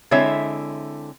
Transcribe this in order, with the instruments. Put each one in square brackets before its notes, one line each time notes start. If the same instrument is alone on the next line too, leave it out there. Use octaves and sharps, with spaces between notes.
[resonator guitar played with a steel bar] D3 G#3 C4 E4 C#5 E5